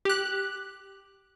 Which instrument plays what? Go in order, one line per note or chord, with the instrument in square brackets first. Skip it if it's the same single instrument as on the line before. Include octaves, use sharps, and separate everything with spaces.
[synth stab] G4 F#6